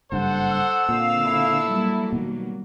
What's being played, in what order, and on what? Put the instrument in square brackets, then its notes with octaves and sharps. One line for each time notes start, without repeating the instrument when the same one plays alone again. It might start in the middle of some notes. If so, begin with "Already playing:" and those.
[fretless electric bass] F#1 G2 [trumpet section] A4 C5 F#5
[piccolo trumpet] E6
[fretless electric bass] A#2 [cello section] D3 C4 F5
[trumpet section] E4 A4
[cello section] F#3 G3 A#3
[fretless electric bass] B2 D#3